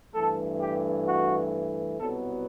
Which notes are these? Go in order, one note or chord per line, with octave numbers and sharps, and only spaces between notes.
G2 E3 A3 A4
G4
F#4
C2 B2 F#3 B3 A4